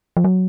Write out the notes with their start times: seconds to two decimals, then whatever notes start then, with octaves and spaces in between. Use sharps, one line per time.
0.17 F3
0.24 F#3